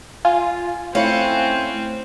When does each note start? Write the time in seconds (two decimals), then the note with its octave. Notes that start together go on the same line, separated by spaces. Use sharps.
0.25 F4 G#5
0.95 A3 C4 C#4 E4 F5 F#6 C#7